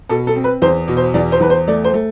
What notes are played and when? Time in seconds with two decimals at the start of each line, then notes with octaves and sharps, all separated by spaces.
0.09 B2 A4
0.27 A4
0.36 C4
0.44 B4
0.62 E2 C5
0.88 B2
0.97 C5
1.14 E2 D5
1.32 C5
1.41 E2 B4
1.50 C5
1.68 A3 D5
1.84 C5
1.94 A3